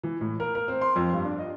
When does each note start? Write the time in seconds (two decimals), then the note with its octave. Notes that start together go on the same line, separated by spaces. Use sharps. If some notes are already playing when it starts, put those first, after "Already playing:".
0.03 E3
0.21 A2
0.40 A#4
0.55 A#4
0.68 C4
0.81 C6
0.96 F2
1.13 G2
1.25 D4
1.39 D#5